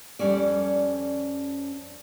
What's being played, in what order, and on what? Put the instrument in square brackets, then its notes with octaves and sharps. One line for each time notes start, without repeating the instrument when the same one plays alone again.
[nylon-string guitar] F2 G3 C#4 D5